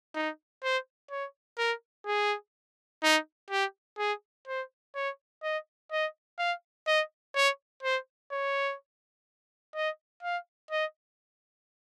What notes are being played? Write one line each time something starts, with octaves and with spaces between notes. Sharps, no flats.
D#4
C5
C#5
A#4
G#4
D#4
G4
G#4
C5
C#5
D#5
D#5
F5
D#5
C#5
C5
C#5
D#5
F5
D#5